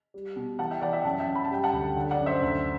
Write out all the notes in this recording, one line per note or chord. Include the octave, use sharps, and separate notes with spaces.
G3
B2
E3 F#5 A5
E5 G5
E3 D5 F#5
E5 G5
F#2 F#5 A5
E5 G5
F#2
B5
A5
G3 G5
F#5 A5
D2
D3
D5 F#5
F#2
C5 E5
D2